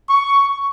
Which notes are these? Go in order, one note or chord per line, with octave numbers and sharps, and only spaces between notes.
C#6